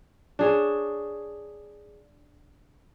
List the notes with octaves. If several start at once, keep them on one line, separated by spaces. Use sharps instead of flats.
D4 G#4 C#5